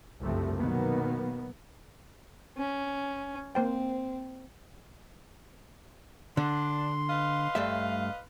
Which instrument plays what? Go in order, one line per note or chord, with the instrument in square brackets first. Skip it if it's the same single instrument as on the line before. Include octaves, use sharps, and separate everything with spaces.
[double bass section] F#1 C2 G2 C3 F3 A3
B2 D#3 F#3 A#3 B3
[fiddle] C#4
[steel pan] A#3 C5 G5 [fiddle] C4
[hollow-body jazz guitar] D3 [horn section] D4 [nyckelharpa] C6
[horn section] B4 D#5 F5
[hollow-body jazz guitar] G2 A3 E5